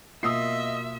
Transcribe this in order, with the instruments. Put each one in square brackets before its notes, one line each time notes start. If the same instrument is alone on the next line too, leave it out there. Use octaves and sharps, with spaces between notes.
[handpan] B2 A#3 F4 [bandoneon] D#5 [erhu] E5 [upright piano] D#6 E6 C7